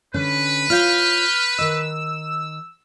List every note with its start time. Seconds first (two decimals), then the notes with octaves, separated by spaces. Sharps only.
0.14 D3 C#4 B4
0.70 F4 C#5 F5 F6 G6
1.59 D#3 D#5 E6